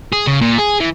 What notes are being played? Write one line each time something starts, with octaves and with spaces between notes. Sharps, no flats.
G#4
C#3
A#2
G#4
E3